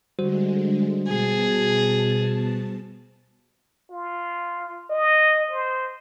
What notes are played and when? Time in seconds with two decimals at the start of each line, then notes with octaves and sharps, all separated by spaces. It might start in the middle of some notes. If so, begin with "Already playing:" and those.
0.19 D3 G3 G#3 F#4 C5
1.08 B2 G#4 A5
3.91 F4
4.90 D#5
5.51 C5